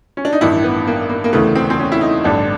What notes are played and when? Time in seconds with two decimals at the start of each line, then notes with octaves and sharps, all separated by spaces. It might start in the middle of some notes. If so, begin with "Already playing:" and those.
0.17 C#4
0.25 D4
0.33 D#4
0.41 A1 G2 D#3 E4
0.64 B3
0.87 A#3
1.09 A#3
1.24 A#3
1.33 E1 D2 C#3 E3 A3
1.55 C4
1.70 C4
1.79 C#4
1.92 E4
2.01 D#4
2.24 A1 G2 D3 D4